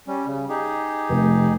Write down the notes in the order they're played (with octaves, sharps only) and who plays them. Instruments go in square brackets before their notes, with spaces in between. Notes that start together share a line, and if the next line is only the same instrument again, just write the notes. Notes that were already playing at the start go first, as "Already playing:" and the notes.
[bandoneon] G3 C#4
C#3
D#4 G4 G#4
[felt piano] F1